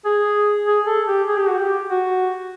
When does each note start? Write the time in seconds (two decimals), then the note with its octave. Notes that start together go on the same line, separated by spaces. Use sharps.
0.05 G#4
0.66 G#4
0.86 A4
1.07 G4
1.27 G#4
1.37 G4
1.48 F#4
1.58 G4
1.88 F#4